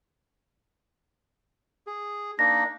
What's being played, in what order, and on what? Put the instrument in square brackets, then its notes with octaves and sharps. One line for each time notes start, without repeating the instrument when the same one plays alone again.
[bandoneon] G#4
[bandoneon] A#3 D4 D#4 [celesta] A#6